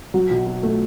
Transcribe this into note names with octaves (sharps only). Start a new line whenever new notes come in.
F#3
B1
F#3
A3